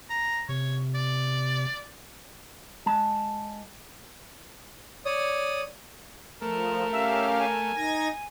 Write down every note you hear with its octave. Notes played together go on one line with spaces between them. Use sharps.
A#5
C3 C#5
D5
G#3 A5
C#5 D5 D#6
F3 A3 A#4
C#4 G4 E5 F5
G#5
D#4 G#6 A#6